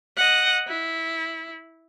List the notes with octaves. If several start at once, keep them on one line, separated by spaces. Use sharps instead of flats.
D#5 F#5
E4